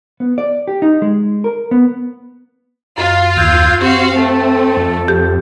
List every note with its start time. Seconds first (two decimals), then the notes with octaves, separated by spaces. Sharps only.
0.20 B3
0.38 D5
0.67 G4
0.82 D#4
1.02 G#3
1.44 A#4
1.71 B3
2.98 F#2 F4 F5
3.36 D#2 E6 G6 G#6
3.81 C4 F#4 G4 F5 F#5 C6
4.16 A3 A4
4.77 F2
5.08 G4